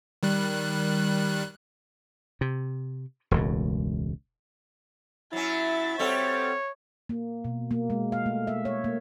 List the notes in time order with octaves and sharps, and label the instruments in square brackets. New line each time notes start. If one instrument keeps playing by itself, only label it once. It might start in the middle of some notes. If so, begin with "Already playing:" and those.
[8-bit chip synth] D#3 G3 F#6
[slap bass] C3
E1 C#2 A2
[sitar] F#3 C#4 [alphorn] E4 [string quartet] E5 A6
[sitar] G3 F#4 A4 [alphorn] C4 [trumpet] C#5
[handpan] A#3
B2
A#3
G#3
F5
A3
E5
C#5
A#3